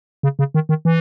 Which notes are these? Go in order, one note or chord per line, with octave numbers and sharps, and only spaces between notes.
C#3
C#3
D#3
D#3
E3